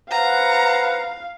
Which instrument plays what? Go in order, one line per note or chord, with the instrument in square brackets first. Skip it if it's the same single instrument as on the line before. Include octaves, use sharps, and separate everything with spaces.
[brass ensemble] B4 C5 F#5 [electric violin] F5 [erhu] A#5